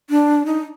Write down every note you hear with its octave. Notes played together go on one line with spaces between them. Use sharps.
D4
D#4